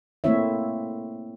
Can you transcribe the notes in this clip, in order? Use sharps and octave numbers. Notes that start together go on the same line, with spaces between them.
A3 A#3 C4 E4 C#5 E5